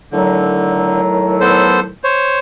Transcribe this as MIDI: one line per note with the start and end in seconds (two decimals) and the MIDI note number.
0.12 1.91 45
0.12 1.01 50
0.12 1.91 51
0.12 1.91 54
1.41 1.80 59
1.41 1.80 69
1.41 1.80 72
2.04 2.39 72
2.04 2.39 73